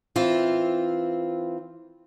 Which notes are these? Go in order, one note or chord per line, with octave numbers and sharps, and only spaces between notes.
E3 C4 F4